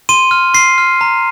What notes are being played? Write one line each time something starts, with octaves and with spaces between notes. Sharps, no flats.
C6 D#7
F6
C6 C7
F6
A#5